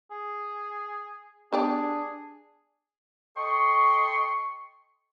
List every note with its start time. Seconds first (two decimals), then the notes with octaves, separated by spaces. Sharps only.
0.11 G#4
1.53 B3 D4 G4 G#4 D5
3.38 A4 D#5 G5 C6 C#6